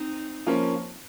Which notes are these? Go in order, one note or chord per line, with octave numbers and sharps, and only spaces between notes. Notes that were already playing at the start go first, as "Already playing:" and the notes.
Already playing: C4 D#4
F3 A#3 C#4